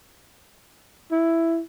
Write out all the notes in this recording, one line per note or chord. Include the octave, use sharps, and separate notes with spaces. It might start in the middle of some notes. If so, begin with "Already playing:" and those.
E4